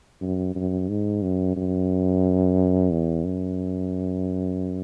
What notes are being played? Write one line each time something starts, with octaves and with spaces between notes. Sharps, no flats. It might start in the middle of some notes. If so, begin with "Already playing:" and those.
F#2
F#2
G#2
F#2
F#2
E2
F#2